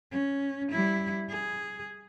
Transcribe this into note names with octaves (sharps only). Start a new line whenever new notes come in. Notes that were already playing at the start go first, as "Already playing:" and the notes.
C#4
G3 E4
G#4